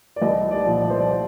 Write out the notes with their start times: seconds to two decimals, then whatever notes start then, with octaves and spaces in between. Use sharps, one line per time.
0.16 D5
0.22 C2 D#5
0.51 D5
0.66 A#2 F3
0.80 D5
0.90 C5
1.00 D5